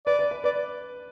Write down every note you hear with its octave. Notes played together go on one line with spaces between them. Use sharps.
B4 D5
B4
B4
B4 D5